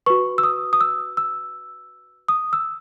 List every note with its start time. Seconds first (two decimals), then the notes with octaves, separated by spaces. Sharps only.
0.06 F#4 B4 C#6
0.38 E6
0.43 D#6
0.73 D#6
0.81 E6
1.17 E6
2.28 D#6
2.53 E6